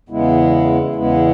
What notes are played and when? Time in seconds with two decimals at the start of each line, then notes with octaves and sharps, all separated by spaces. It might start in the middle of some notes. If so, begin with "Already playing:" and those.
0.09 E2 C#3 G#3 B3 E4
0.95 E2 C#3 G#3 B3 E4